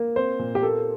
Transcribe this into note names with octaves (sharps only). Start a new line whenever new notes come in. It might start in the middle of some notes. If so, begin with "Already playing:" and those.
Already playing: A#3
C4 C5
A#2
G4
A#3 A4